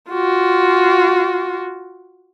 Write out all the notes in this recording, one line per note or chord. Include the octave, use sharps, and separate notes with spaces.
F4 F#4